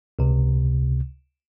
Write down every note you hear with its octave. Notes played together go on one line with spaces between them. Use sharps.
C#2 C3